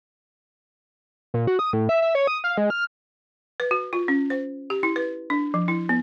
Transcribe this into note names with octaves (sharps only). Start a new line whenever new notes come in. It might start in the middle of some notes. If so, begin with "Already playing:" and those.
A#2
F#4
D#6
A2
E5
E5
C#5
D#6
F5
G#3
F6
B4
F#4
F4
C#4
C5
G4
E4
B4
D4
F3
E4
B3